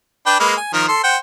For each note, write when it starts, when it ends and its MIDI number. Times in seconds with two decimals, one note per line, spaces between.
0.26 0.39 62
0.26 0.39 71
0.26 0.39 79
0.40 0.55 56
0.40 0.55 58
0.40 0.55 71
0.57 0.72 80
0.73 0.88 51
0.73 0.88 53
0.73 0.88 70
0.89 1.02 69
0.89 1.02 84
1.04 1.17 72
1.04 1.17 78
1.04 1.17 79